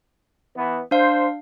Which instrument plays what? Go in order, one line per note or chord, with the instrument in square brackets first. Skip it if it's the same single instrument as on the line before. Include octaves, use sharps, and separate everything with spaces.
[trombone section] E3 B3
[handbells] D4 F5 [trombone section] C5